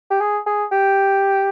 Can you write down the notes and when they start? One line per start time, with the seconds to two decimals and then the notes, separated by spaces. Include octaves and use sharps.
0.11 G4
0.20 G#4
0.47 G#4
0.72 G4